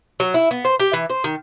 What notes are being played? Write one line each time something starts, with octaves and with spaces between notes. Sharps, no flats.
F#3
E4
B3
C5
G4
E3
C5
D#3